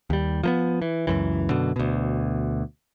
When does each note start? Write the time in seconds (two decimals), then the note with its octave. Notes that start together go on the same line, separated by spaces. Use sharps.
0.10 D#2 G3
0.43 F3 A#3 B3
0.82 E3
1.07 C#2 F#2 E3
1.50 F#2 B2 D3
1.76 D2 B2